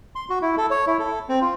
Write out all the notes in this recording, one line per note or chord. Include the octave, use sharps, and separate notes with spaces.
C6
F#4
E4
A4
C#5
E4
A4
C4
F4